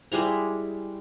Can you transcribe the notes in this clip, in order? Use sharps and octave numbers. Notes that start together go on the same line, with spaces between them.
G3 G#3 E4 A#5